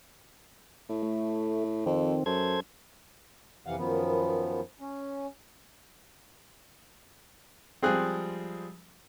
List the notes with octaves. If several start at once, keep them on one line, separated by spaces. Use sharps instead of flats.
A2
A3
F2 D#3 C4
F#2 A4 C5 G#6
F2 C3 E3 F5 F#5
F#2 D#3 F3 B3
C#4
F3 G3 G#3 C4 G#4 F#6